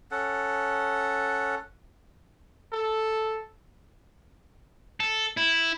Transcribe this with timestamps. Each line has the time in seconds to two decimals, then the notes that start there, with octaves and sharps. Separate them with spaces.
0.11 C#4 A4 F#5
2.72 A4
5.00 A4
5.37 E4